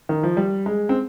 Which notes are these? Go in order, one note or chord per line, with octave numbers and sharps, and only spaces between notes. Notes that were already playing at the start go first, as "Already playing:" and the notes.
D#3
F3
G3
G#3
C4